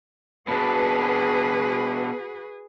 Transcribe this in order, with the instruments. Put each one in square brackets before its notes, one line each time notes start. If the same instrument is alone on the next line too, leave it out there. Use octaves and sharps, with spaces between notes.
[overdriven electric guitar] B2 D4 [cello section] F#4 B4 [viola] G#4